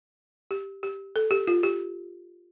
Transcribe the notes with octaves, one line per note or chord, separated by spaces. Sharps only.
G4
G4
A4
G4
F4
G4